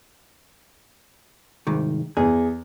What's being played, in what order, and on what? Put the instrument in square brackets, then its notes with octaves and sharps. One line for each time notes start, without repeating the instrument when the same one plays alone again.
[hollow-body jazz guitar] C2 G#2 D#3
[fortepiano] E2 [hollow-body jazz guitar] G#4